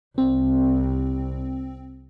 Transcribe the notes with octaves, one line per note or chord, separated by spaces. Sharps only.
C2 C4